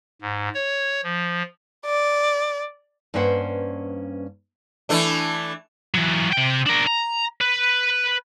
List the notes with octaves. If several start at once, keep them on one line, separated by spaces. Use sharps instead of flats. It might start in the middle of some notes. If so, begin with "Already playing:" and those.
G#2
C#5
F3
D5
G2 A#3 C#4 B4 C5 F#5
E3 A3 D4
E3 F#3
C3 G5
D4 A#4
A#5
B4